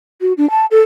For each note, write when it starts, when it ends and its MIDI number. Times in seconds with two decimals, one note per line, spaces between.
0.21 0.33 66
0.37 0.49 62
0.50 0.66 81
0.71 0.80 69